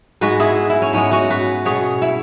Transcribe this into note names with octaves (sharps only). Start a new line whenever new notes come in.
G#2 G#3 B3 F#4 B4
E4 G#4
E4
C#4
G#2 G#3 B3 C#4
C#4 F#4
F#4 B4
B2 B3 G#4 C#5
E4